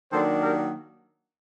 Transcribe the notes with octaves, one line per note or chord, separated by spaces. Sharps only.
D#3 F#3 A#3 D4 A4 C5
G4 A#4